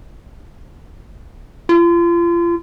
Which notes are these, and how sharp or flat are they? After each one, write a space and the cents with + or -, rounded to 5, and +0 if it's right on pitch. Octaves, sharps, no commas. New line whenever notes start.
F4 -35